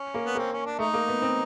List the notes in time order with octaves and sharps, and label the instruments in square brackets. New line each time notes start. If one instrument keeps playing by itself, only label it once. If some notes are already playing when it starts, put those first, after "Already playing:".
Already playing: [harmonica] C#4
[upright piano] A#3
[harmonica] B3
[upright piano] A#3 [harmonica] C4
[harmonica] C#4
D4
[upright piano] A3 [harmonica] D#4
[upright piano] A#3
B3
C4